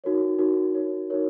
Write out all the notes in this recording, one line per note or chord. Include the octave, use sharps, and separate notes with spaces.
D#4 F#4 A#4 C#5
D#4 F#4 A#4 C#5
D#4 F#4 A#4 C#5
D#4 F#4 A#4 C#5